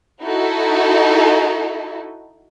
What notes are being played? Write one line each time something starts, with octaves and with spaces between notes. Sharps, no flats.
D#4 E4 F#4 A4